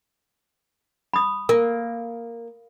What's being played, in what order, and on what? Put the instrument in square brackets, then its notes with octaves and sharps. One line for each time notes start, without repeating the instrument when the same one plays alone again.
[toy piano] B5 D#6
[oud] A#3 [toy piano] A#4